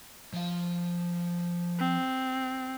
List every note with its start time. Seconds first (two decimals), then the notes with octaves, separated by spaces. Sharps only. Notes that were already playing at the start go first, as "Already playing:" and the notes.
0.33 F3 F5
1.79 C4